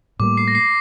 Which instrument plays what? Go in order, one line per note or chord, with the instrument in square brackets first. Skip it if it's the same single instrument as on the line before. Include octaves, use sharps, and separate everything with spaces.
[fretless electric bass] A2 G3 A#3 [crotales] D6
[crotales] C7
A#6
C7